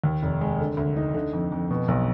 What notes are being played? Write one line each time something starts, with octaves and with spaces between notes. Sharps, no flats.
D#2
F1
G#3
D3
D2
D#4
D3
F2
F2
B2
B1